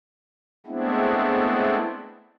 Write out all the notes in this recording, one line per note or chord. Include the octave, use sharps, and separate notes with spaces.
G#3 A3 B3 C4 D4 E4